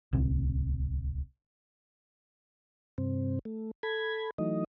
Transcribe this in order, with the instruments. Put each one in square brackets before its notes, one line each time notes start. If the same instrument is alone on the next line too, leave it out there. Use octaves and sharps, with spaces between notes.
[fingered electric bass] D1 C2
[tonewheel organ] G2 C3 C4
A3
A4 B5 G#6
E3 F#3 A3 D#4 D#5